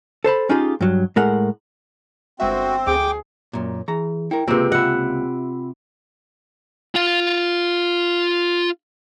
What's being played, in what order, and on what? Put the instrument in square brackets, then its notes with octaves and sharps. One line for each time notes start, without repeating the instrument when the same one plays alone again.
[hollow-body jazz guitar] A4 C5 A5 B5
C#4 D#4 F4 G4 G#4
G2 F#3
A2 G#3 A#4 F#5
[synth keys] G1 G#3 E5 [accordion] C4 [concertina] F#4
[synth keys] D2 [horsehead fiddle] G#4 [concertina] G5 D6
[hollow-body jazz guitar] F#2 A#2
[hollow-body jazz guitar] E3 A#5 [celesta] G#4
[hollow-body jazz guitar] E4 A#4 [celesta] G5
[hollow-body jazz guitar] C#2 A#3 [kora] C3 C4 [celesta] F4 G#4 B4
[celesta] F4 B5 [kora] E5 F#5
[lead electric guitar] F4 F5